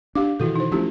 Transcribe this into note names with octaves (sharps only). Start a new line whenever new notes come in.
D4 G4 F5 D6
B2 D#3 E3 E4 F#4 A4
D#4 C5
F3 A3 C#4 E4 G4